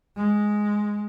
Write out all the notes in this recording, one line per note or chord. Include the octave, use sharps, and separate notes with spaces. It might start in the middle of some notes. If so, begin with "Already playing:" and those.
G#3